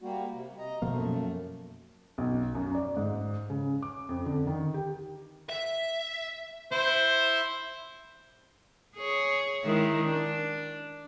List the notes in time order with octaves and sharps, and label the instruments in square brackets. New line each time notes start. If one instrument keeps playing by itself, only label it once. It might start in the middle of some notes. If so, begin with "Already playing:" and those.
[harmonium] G3 A#3 F#4
C3
D#5 A#5
[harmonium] F#2 A3 [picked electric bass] B2 F3 A#3
[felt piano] B1
F#2
D5
G#2
C#3
D6
F2
D3
D#3
G4
[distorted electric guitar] E5
[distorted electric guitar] E4 [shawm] C5
[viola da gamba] G#4 C#5
D#3 G#3 E4
D4